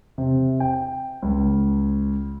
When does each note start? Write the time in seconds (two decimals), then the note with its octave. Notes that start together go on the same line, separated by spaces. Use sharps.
0.18 C3
0.60 G5
1.22 C#2